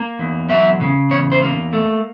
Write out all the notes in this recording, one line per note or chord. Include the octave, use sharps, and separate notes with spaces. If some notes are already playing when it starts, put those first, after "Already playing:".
Already playing: A#3
E2
F#3 E5
C#3
E2 C#5
C5
A#3
A3